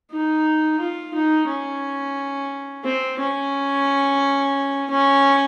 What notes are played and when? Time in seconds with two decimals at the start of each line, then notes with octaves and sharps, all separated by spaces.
0.11 D#4
0.80 F4
1.14 D#4
1.48 C#4
2.85 C4
3.19 C#4
4.90 C#4